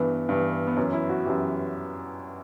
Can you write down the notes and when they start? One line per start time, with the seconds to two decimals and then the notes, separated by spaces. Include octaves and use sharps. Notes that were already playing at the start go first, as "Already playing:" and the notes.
Already playing: G2 E3 B3
0.29 G2 E3
0.67 B3
0.77 F#2 E3 C#4
0.93 E4
1.09 F#4
1.26 F#2 E3 G4